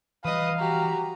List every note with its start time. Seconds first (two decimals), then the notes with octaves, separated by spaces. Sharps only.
0.25 E3 F3 G3 B4 D#5 F5 D#6
0.58 F#4 G4 A#5